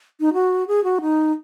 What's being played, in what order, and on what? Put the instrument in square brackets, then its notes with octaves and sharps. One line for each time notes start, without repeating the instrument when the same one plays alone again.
[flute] D#4
F#4
G#4
F#4
D#4